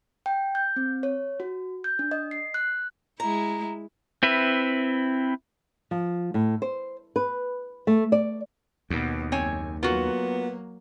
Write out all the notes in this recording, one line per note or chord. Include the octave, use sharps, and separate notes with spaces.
G5
G6
C4
C#5
F#4
G6
D4
D#5
C7
F#6
G#3 E4 A#5
C4 E4 B4 E5
F3
A2
C5
B4
A3
D5
D#2 B2 B3
F#1 C4 C#5 G#5
F#3 A#3 B3 F4 F#4